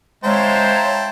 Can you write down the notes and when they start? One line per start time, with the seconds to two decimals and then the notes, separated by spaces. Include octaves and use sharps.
0.24 G#3 E4 C5 C#5 F5 G5 A5 A#5